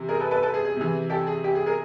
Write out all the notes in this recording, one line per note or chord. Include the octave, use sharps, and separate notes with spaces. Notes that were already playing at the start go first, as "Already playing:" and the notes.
Already playing: C3 E3
G#4 A#4
A4 B4
A4 B4
A4 B4
G#4
G#4
C3 E3
G4 A4
G#4
G4
G#4
G#4 A#4